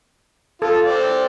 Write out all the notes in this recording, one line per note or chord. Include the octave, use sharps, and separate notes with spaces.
F4 A4
C4 D5